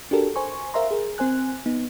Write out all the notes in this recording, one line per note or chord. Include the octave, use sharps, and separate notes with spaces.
D4 F#4 G4 A4 A#4
C5 G#5 C#6
A#4 C5 E5 F5 A#5 C6
G#4 A#4
C4 C5 G#5 F#6
B3 D#4